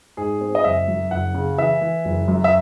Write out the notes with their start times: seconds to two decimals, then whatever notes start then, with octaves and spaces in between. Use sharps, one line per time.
0.17 G#2 G#4
0.41 C4
0.55 D#5
0.64 F#1 E5
0.88 F#2
1.11 F#1 F#5
1.34 C#3
1.58 E3 E5
1.81 E3
2.05 F#1
2.28 F#2
2.44 E5